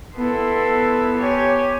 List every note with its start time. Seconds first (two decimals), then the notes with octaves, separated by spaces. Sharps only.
0.16 B3 E4 A4 C6
1.18 G4 C#5 G#5